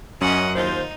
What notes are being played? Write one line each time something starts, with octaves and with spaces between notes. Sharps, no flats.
F#2 C#4 D#5 F#5
D#2 D#4 F4 C5